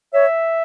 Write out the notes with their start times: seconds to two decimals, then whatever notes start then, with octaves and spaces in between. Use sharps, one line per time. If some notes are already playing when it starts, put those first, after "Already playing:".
0.13 C#5 E5